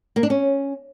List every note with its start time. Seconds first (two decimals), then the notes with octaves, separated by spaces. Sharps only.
0.16 A#3
0.23 D4
0.30 C#4